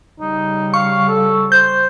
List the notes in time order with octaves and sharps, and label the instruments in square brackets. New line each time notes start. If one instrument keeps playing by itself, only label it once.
[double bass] C#3 G3 [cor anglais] D#4
[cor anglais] F5 [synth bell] C#6
[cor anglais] A4
[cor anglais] C5 [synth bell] G6